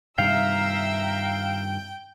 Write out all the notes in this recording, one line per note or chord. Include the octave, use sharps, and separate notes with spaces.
G2 C3 D#3 E5 F5 G5 A#5 E6